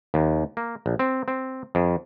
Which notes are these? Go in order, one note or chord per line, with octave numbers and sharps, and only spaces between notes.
D#2
A#3
A#1
C4
C4
F2